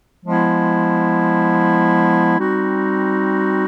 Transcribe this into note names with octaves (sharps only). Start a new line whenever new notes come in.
F3 G#3 B3 E4
G3 C4 D#4 F#4